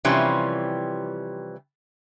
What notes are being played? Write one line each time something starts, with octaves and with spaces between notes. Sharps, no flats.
C3 E3 F3 G3 C#4